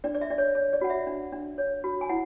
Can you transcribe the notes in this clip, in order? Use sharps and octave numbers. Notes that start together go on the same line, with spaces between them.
D4 D5
D5
E5
D4 D5
C#5
C#5
D5
F#4 F#5
E5
D4
D4
C#5
F#4
G#5
E4 F#5